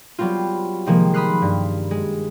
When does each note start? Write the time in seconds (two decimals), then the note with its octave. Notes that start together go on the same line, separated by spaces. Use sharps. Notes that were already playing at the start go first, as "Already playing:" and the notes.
0.18 F#3 G3 B3 C4 F4
0.86 C3 D#3 F3 G#3 A#3
1.14 B5 C6 D#6 F6 F#6 C7
1.42 G2
1.91 G#3